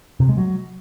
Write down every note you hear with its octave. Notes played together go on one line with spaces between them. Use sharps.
C3
G#3
F#3